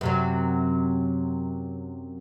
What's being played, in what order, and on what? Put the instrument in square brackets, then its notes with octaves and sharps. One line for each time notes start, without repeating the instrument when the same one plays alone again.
[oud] F#2 C3 F#3